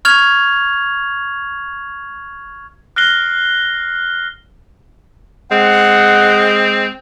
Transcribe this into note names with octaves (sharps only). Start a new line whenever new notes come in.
C#6 F6 G#6 F7
F6 F#6 A#6 C7 G7
G#3 C4 F#5